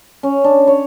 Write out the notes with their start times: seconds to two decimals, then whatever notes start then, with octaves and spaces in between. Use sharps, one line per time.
0.23 C#4
0.44 D4
0.67 C#5